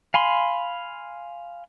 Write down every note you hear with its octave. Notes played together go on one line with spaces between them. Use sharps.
F5 G#5 B5 C6